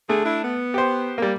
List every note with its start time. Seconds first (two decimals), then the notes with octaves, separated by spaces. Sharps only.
0.09 D3 A3 G#4
0.25 D4 E4
0.44 B3
0.74 G4 C5
1.18 G3 A#3